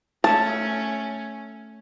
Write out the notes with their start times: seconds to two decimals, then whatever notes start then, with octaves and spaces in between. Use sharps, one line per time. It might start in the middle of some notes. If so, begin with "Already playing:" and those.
0.24 A3 C#4 A5